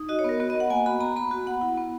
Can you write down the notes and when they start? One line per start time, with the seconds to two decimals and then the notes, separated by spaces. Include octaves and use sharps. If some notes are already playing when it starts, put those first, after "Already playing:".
Already playing: D#4
0.09 F#4 D#5
0.19 C#5
0.24 B3 A#4
0.40 B3 F#4
0.50 D#5
0.55 B3 F#5
0.70 A#3 G#5
0.86 F#4 B5
1.01 B3 A#5
1.16 B3 B5
1.31 F#4
1.46 B3 F#5
1.61 E4
1.77 B3